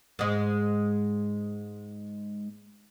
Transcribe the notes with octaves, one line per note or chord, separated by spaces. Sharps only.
G#2 G#3